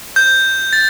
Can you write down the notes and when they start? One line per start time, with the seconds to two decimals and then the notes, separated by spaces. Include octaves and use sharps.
0.16 G6
0.73 A6